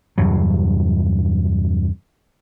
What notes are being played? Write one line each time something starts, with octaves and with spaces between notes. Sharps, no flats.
E2 G2 C3 F#3